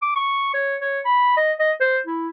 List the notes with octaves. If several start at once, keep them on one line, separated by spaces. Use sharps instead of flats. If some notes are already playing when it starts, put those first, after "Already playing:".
D6
C#6
C#5
C#5
B5
D#5
D#5
C5
E4